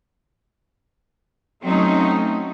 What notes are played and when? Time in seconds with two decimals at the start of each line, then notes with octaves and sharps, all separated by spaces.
1.63 F#3 A3 C4 C#4 D#4